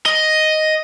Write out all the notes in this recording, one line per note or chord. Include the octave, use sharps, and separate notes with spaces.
D#5